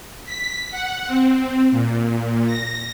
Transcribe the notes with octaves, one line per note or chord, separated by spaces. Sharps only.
B6
F#5
C4
A#2
A#6